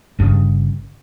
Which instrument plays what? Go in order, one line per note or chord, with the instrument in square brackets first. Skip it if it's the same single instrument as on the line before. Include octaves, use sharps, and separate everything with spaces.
[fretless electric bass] G1 G2 A#2 C#3